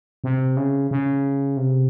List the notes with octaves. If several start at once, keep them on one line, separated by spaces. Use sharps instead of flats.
C3
C#3
C#3
C3